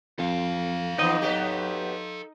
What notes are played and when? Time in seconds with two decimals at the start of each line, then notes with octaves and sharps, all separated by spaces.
0.19 F2 A4 F5
0.98 E3 B3 D#4 D#5
1.22 F#3 B3 G4